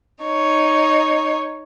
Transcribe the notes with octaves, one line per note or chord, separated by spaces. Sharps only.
D#4 C#5